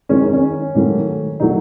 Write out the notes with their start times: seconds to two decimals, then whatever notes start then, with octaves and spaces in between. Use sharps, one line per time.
0.09 F#2 D#3 G#3 C#4
0.22 D#4
0.33 C#4
0.75 G#2 D#3 F#3 A3
1.40 D#3 F#3 A3 D#4